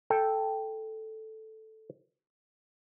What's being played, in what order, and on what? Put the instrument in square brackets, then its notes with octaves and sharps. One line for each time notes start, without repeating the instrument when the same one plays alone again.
[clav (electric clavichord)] A4 G5